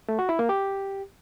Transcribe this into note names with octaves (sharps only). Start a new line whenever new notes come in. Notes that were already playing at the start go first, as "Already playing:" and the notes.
A3
F#4
E4
A#3
G4